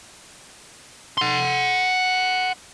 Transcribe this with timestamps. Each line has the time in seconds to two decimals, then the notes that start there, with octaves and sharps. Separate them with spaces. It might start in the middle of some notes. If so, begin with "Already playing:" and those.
1.18 F#5 C6